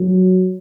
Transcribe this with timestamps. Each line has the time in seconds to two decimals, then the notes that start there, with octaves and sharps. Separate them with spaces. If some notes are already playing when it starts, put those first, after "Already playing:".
Already playing: F#3